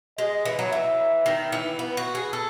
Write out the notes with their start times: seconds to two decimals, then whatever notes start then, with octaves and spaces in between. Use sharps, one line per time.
0.18 G#3 D#5
0.45 E3
0.59 F#3
0.72 E3 E5
1.26 D#3
1.52 E3
1.79 B3
1.97 F#4
2.15 G#4
2.33 A4